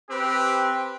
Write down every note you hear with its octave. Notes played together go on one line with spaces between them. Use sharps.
C4 G4 B4